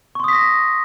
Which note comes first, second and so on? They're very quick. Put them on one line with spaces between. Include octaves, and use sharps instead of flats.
C#6 C6 D#6 B6 A#6